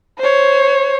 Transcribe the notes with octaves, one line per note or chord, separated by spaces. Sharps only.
C5 C#5